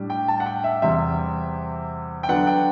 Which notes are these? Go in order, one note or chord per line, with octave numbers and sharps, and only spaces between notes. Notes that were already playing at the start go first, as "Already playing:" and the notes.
Already playing: A2 G3 D4
G5
A5
F#5
G5
E5
E2 C3 G3 C4 E5
G5
D3 F#3 B3 D4 F#5
G5